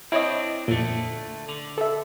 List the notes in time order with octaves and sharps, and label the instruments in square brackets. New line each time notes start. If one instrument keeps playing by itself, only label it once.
[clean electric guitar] C4 D4 [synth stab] E4 C#5 D#5
[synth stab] F2 A#2 [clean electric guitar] D3 A3
[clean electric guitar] D3
[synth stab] A4 E5